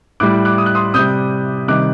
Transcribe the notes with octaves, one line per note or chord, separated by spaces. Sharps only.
A2 G3 D6 F#6
D6 F#6
D#6
F#6
C6 D#6
C3 G3 D#6 G6
C3 D#3 G3 D6 F#6